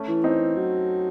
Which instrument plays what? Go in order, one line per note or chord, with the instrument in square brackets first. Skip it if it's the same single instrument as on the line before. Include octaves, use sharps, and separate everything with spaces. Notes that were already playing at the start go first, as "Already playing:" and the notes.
Already playing: [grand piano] A3 C#4
[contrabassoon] E3
[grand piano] C4 D#4
[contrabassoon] F#3